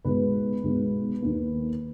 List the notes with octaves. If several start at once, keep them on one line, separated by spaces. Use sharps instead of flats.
B1 B2 G#3 B4
B1 B2 G#3
D#2 D#3 A#3